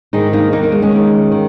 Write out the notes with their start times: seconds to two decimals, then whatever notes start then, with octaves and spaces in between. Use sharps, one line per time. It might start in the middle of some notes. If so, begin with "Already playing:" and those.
0.13 G#2 D#3 D#4 G#4
0.33 A#3 D#4
0.52 D#2 D#3 A#3 D#4
0.63 A#3
0.72 G#3
0.82 G#3 C#4
0.92 D#2 D#3
1.32 D#3